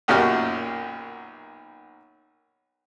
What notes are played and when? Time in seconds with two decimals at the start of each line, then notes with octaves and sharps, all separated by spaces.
0.08 B1 F#2 A#2 F#4 G4 F6